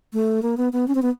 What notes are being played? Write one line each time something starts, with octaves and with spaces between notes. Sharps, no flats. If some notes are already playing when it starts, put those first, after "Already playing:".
A3
A#3
B3
B3
C#4
C4
B3